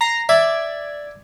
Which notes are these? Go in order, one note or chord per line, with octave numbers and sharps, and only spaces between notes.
A#5 A#6 C7
D5 E5 G#6